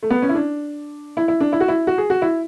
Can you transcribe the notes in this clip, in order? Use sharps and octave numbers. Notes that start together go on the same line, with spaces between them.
A3
B3
C#4
E4
D4
E4
E4
D4
E4
F#4
E4
F#4
G#4
F#4
E4